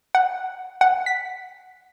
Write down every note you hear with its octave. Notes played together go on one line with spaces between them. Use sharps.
F#5
F#5
B6